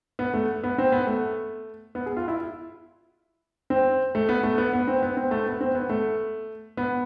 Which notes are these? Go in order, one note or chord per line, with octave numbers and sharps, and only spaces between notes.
B3
A3
B3
C4
B3
A3
B3
G#4
F4
E4
C4
A3
B3
A3
B3
B3
C4
B3
C4
A3
B3
C4
B3
A3
B3